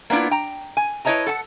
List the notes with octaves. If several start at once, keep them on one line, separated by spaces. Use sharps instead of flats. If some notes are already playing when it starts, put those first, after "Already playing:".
A#3 B3 D4 E4 F4
G5 A#5
G#5
E4 B4 C#5 D#5 A5 A#5
A4 F#5 A5